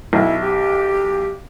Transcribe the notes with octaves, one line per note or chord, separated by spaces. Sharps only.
B1 E4
G4